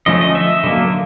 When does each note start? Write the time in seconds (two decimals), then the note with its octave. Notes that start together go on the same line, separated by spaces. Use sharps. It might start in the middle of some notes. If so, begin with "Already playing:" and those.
0.06 D3 F3 A3 C#4 D#5
0.21 D#5
0.35 E5
0.64 D3 F#3 A#3